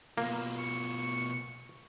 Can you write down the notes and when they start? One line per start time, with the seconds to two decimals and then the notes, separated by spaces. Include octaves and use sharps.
0.18 B2 A#3 F4
0.58 C#6